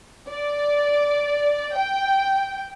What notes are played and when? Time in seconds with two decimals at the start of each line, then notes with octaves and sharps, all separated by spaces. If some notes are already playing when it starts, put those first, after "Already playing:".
0.28 D5
1.77 G5